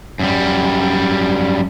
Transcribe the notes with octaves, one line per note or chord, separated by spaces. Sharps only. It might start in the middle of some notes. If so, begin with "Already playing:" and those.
F#2 G3